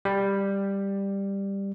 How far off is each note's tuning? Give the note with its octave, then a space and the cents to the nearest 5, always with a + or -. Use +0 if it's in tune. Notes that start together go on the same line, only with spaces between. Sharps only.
G3 +10